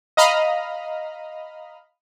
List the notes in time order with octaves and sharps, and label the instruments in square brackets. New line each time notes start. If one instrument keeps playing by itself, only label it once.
[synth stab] D#5 F5 A#5 B5 D#6 F6